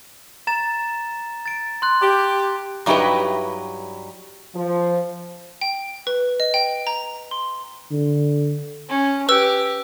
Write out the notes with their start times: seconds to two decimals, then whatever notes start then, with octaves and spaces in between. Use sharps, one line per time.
0.47 A#5 A6 E7
1.46 A6 D7
1.82 C6 F#6
2.02 G4
2.86 G2 F#3 D#4 E4 G4 B4
4.55 F3
5.62 G5
6.07 B4
6.40 D#5
6.54 G5
6.87 A#5
7.31 C6
7.92 D3
8.89 C#4
9.29 G4 B4 E6